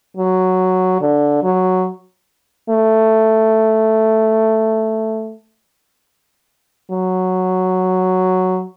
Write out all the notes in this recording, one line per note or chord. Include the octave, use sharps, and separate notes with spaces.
F#3
D3
F#3
A3
F#3